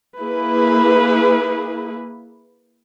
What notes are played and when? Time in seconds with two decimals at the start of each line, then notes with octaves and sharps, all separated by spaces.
0.18 A#3 E4 G#4 B4